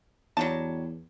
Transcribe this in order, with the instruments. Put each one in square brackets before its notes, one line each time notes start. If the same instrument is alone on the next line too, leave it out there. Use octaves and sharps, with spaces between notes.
[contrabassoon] E2 [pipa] F#3 G3 A5